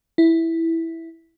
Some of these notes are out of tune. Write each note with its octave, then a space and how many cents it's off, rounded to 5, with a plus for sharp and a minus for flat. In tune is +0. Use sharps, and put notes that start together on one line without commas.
E4 -5